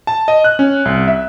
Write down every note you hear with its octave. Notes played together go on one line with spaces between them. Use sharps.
A5
D#5
F#6
C#4
C2
E5